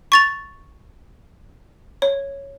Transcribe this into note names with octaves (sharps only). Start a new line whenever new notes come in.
C#6 A6 F7
C#5